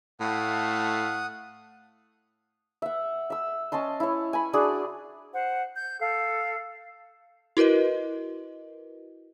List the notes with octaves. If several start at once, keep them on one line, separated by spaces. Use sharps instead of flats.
A2 A3 F5 F#5 D#6
E5 F#5
E5 E6
C#4 D#5 A5 C6
E4 C#5
G#5 B5
D4 F#4 G#4 D5
C5 F#5
G6
A4 F5
E4 F#4 A#4 B4 D#5